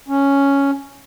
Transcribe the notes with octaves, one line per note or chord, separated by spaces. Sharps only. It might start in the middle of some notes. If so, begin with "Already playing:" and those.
C#4